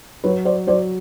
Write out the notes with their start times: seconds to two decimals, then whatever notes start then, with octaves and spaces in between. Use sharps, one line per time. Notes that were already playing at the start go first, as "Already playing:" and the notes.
0.24 F#3 B4 C#5
0.45 C5 D5
0.67 F#3 C5 D5